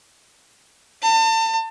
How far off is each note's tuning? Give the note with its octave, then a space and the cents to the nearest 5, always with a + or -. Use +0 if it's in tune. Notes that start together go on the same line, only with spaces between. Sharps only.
A5 +35